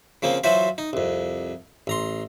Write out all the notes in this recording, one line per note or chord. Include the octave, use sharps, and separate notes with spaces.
C#3 F3 A#3 C4
E3 F#3 F4 F#4 C5 E5
D#4
C2 F2
A1 A#5 C6